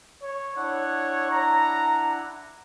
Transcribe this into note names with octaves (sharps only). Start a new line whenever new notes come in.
C#5
D4 E4 C#5 F#5
A#5